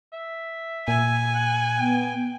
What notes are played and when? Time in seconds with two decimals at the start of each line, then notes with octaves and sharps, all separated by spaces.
0.13 E5
0.88 A#2 G#5
1.34 F#5
1.79 B3 G5